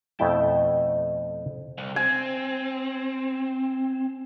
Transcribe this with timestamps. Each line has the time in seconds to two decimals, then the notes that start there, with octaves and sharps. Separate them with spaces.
0.19 F2 B2 A3 E4 G5 A5
1.78 C2
1.96 C4 G#5